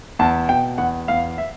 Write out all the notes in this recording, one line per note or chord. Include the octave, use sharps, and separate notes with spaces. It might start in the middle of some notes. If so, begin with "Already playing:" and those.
E2 A5
B2 G5
E2 F#5
E2 F5
E5